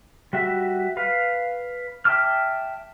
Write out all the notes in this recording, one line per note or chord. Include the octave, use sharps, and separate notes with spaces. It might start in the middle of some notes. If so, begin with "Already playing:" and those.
G3 F#4 E5
B4 F5
E5 G5 A5 D6 F6